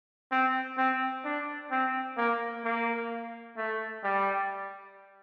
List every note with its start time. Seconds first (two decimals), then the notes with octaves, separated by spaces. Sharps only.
0.31 C4
0.78 C4
1.25 D4
1.71 C4
2.17 A#3
2.64 A#3
3.57 A3
4.04 G3